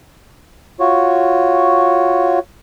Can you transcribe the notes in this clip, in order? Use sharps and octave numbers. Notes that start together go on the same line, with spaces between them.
F4 F#4 C#5